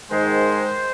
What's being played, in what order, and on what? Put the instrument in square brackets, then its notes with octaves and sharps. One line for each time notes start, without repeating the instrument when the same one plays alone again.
[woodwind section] G#2 D#3 G#3 C5